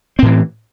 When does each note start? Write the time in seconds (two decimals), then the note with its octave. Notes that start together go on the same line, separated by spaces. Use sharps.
0.19 C4
0.22 A2
0.26 E3